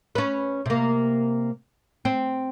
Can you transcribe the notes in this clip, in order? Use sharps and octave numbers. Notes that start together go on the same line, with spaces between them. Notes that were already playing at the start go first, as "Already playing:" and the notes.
C#4 B4
C3 A#3
C4